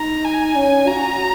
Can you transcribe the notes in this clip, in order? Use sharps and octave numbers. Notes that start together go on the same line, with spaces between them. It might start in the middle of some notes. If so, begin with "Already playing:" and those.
Already playing: D#4 A#5
G#5
C#4
F#4 A#5